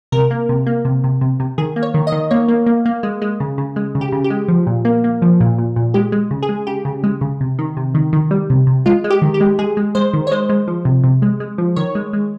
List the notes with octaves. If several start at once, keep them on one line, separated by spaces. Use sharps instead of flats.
C3 A#4
A#3
C3
A#3
C3
C3
C3
C3
D#3 G#4
A#3
C#5
D#3
D#5
D#3
A#3 C#5
A#3
A#3
A#3
G#3
G#3
C#3
C#3
G#3
C#3
G4
C#3
G4
G#3
F3
A#2
A#3
A#3
F3
A#2
A#2
A#2
G#3 G4
G#3
C#3
G#4
G#3
C#3 G4
C#3
G#3
C#3
C3
D#3
C3
D#3
D#3
G3
C3
C3
G#3 F4
G#3
G4
D#3
G4
G#3
G#3 G#4
G#3
G#3 C5
D#3
C#5
G#3 C5
G#3
F3
C3
C3
G#3
G#3
F3
D#3 C#5
G#3
G#3